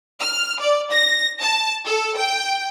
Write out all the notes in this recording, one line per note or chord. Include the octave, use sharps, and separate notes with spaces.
F6
D5
A#6
A5
A4
G5